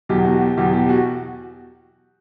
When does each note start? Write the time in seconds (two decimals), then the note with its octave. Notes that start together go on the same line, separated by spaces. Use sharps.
0.09 E2 B2 F#3 G4
0.25 F#4
0.41 G4
0.57 E2 B2 F#3 G4
0.73 G4
0.89 F#4